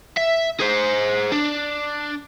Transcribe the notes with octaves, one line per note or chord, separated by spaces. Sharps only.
E5
G#4 C5
D4